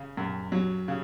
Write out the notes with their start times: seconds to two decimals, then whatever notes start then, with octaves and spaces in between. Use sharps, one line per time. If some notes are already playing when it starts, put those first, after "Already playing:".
Already playing: C#3
0.17 F#2
0.52 F#3
0.88 C#3